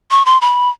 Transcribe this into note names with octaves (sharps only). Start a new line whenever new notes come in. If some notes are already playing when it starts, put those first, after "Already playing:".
C#6
C6
B5